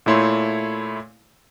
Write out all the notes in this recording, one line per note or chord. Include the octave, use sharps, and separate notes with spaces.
A#2 A3 E4 C#5 C6